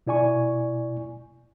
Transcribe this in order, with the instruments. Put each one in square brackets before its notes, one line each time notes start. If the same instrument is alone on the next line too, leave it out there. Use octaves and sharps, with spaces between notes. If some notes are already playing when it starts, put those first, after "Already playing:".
[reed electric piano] B2 E4 D5 G#5 C#6